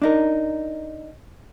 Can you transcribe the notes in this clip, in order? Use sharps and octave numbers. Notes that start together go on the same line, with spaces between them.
D4 D#4 A#4